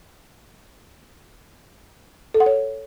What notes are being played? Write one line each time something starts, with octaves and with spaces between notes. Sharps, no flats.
A4
F#5
C#5